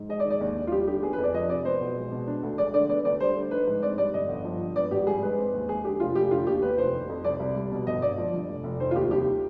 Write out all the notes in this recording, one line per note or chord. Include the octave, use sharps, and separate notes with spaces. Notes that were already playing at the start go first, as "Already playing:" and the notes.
Already playing: G#2
G#3 D#5
D5
D#3
D5
D#2
D#2
F4
G3 G4
D3 G4
B3 G#4
B4
F2
D5
F3 D#5
C3 D5
B3 C5
B1
G#3
B2
D4
D2
G#3 D5
D3 D5
B3 D5
D2 D5
G3 C5
D3
D#4 B4
G#2
C4 D5
G3 D5
G1 D#5
G1
F3
G2
B3 D5
G#1 G4
G3 G#4
G#2 B4
C4
D#2
G#3 G#4
D3 G4
F1 F4
F1 G4
D3 F4
D#2 G4
B3 B4
F1 C5
D#3
F2
C2 D5
C2
G3
B2
G1 D#5
G1 D5
F3
G2
F1
F1
D#3 C5
F4
D#2 G4
C2 G4